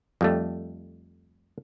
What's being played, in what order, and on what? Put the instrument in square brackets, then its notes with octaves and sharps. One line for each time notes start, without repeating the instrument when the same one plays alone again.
[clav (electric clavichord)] F2 G3 A3